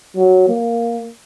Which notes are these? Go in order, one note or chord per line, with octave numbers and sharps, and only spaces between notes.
F#3
A#3